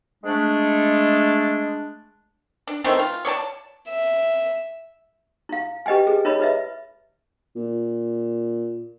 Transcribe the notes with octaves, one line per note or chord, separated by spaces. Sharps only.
G#3 A3 D4
D4
D#3 E3 A3 C4
F4
C#5 D5 G5 A5
E5
E4 F5
G4 B4 D#5 G5 G#5
G#4
E4 A#4 C#5 D#5 B5
E4 B4 D#5 E5
A#2